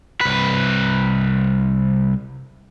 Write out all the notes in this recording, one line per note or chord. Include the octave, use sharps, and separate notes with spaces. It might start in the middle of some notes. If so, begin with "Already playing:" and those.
C2 B4